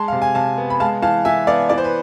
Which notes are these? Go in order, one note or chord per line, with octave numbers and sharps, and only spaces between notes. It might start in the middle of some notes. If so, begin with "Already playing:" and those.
Already playing: G#3 A5 C6
C3 F5
G#5
C3 F5 A5
B3
B5
G#3 F5 A5
E3 F5 A5
E3 E5 G#5
B3 D5 F5
E3 D5
C5
B4